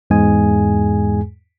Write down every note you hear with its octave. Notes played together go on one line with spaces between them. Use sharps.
E2 G#2 G#3 G#4 G#5